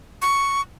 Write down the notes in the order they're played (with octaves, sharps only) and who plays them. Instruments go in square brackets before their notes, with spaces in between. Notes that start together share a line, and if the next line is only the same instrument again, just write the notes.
[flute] C#6